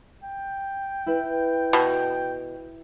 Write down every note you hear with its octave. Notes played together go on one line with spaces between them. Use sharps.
G5
E4 B4
B2